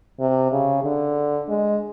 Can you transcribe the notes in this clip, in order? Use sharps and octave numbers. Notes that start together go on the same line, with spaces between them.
C3
C#3
D3
G#3